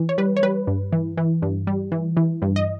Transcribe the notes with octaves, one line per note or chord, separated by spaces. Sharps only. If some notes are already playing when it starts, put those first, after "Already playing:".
Already playing: E3
C#5
G3 B4
C#5
G3 B4
G2
E3
E3
G2
G3
E3
E3
G2
D#5